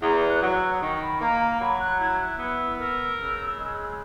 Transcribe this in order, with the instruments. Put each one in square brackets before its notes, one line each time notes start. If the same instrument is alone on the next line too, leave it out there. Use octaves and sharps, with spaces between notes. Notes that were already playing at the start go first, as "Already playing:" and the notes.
[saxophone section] E2 [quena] A#5
[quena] F#6
[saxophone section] F#3
[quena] E6
D#6
[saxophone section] D#3 [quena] C#6
[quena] B5
[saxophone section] A#3 [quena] A#5
[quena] A#5
[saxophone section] F#3 [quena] B5
[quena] F#6
[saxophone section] E4 [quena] G#6
[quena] F#6
[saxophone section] B3 [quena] E6
[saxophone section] A#4 [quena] E6
[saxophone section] C#3
G#3